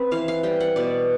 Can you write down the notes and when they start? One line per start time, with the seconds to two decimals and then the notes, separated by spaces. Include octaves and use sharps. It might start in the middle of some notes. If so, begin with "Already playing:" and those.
Already playing: C4 B4
0.11 E3 F5
0.28 F5
0.43 G3 G5
0.60 F#5
0.76 B2 D5